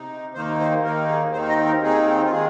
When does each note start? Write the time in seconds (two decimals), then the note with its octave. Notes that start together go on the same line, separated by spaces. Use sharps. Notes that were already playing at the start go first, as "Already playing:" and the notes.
Already playing: C3 D#4
0.34 D#2 D#3 A#3 D#4 C5
0.60 C5
0.83 D#2 D#3 A#3 D#4 A#4
1.09 G#4
1.33 D#2 D#3 C4 D#4 C5
1.49 D#5
1.65 A#4
1.82 D#2 D#3 C4 D#4 G#4
2.24 F4
2.31 D#3 G#3 G#4